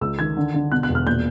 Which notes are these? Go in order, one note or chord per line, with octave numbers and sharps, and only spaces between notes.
C#2 E6
D#3 G#6
D3
D3
B2 F#6
F#6
E1
F6
A#2 G6